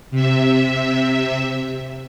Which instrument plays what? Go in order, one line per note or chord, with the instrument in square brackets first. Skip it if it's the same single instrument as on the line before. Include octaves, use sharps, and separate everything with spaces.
[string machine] C3 E5